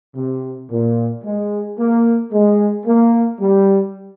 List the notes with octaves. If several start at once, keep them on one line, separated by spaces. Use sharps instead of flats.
C3
A#2
G#3
A#3
G#3
A#3
G3